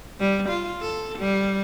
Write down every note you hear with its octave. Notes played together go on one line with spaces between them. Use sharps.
G3
F4
A4
G3